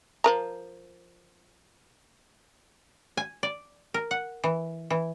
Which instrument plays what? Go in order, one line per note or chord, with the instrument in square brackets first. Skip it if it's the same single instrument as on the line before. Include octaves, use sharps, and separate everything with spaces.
[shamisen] F3 A#4 A#5
[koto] G#5
D5
A#4
F#5
E3
E3